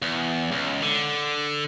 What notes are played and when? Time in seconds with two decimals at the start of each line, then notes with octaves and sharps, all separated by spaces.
0.02 E2
0.52 C#2
0.83 D3